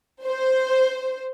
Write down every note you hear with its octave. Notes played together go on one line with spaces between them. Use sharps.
C5